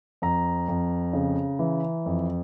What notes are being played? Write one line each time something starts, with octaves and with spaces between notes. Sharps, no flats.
F2 A#5
F2
C#3
E3
F2